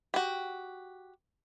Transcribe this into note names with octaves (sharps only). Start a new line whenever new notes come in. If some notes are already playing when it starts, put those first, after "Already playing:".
F#4 G4